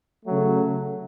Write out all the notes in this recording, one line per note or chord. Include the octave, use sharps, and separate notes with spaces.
C#3 F#3 A3